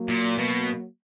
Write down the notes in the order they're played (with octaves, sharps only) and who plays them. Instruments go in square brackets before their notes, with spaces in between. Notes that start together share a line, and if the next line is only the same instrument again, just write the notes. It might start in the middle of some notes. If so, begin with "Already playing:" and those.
Already playing: [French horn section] F#3 A#3
[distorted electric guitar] A#2
B2